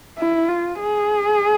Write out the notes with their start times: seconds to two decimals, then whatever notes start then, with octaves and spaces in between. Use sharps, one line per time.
0.18 E4
0.49 F4
0.80 G#4